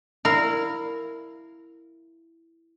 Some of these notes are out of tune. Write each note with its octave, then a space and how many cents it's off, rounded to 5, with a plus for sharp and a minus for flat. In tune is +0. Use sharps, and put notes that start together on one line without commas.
E4 +5 A#4 -15 F5 +0